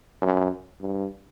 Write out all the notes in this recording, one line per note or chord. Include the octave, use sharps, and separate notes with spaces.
F#2
G2